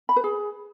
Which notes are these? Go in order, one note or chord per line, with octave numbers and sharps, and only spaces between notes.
B5
B4
G#4